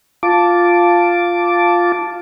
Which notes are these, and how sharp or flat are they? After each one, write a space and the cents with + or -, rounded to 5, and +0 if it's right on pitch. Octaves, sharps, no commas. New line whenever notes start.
F4 +0 A5 +0 D6 -5